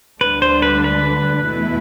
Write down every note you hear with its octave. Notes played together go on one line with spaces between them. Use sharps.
D2 D3 G3 D4 B4
C5
B4
B4
E2 B2 A3 E4